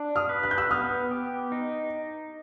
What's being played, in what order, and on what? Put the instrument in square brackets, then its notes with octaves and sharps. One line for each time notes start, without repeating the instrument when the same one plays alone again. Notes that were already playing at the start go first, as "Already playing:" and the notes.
Already playing: [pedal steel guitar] D4
[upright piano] D#6 F6
[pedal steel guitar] B4
[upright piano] F#6
G6
E6 F#6
[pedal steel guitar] B3 [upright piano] D#6 F6
[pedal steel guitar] G4
D#4